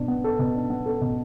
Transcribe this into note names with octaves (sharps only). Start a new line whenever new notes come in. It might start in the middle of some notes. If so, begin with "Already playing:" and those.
Already playing: B2 D4
B3
A4
B2
D4
B3
A4
B2